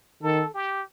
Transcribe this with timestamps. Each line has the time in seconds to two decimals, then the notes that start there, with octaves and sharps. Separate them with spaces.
0.22 D#3 A4
0.54 G4